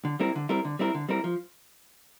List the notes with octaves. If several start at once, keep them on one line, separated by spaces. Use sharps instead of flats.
D3
G3 C4 E4 A#4
D3
G3 C4 E4 A#4
D3
G3 C4 E4 A#4
D3
G3 C4 E4 A#4
F3